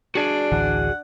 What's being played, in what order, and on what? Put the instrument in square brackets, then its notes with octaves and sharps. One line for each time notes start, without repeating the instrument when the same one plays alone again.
[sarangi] D4 [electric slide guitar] F#4 G#4 D5
[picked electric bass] A1 D2 E3 [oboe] F#5